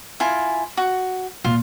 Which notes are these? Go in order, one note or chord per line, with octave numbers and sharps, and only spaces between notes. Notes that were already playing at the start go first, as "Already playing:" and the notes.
E4 F4 G#5
F#4
D#2 A#2 F4